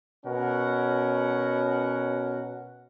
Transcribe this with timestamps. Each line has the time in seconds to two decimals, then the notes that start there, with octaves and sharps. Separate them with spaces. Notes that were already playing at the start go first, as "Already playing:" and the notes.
0.25 B2 C#4 A#4 F#5